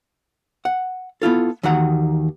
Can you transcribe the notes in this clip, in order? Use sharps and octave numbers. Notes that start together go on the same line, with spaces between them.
F#5
B3 E4 F4 A4
D#2 D#3 E3 F#4 F#5 A#5